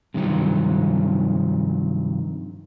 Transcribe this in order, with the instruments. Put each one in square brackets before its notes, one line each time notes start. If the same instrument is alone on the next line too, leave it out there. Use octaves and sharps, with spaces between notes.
[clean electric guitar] G2 C3 D#3 F3 F#3